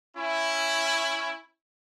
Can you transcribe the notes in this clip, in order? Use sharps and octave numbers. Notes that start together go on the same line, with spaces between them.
C#4 E4